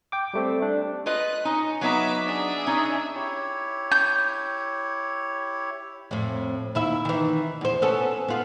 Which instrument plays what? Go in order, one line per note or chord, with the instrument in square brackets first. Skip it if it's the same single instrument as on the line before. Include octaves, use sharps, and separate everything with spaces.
[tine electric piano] G5 D6
G3 A3 C4
D4
[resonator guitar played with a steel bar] F4 B4 D#5 [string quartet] F#6
[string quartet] C#4 [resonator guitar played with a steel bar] D#4
[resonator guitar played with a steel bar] F#3 B3 D#4 [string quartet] B4 E5 D6
[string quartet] D4 G#4 E5
[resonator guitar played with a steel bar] C#4 D#4
[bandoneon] E4 G4 C#5
[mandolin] G6
[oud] F2 A2
D#2 E4 E5
D#3 E3
E2 C5
B3 C#4 A4
B3 F4